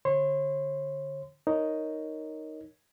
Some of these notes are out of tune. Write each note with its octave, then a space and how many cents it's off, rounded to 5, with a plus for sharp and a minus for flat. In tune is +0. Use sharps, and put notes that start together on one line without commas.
D3 +0 C#5 -40 C6 -30
D#4 +0 A#4 +0 C#5 +0